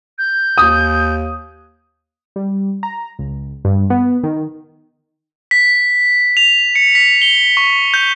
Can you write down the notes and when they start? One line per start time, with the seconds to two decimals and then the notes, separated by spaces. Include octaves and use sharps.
0.18 G6
0.58 D#2 D#6
2.36 G3
2.83 A#5
3.19 C#2
3.65 G2
3.90 B3
4.24 D#3
5.51 B6
6.37 F7
6.75 C#7
6.95 B6
7.22 G7
7.57 C#6
7.94 G6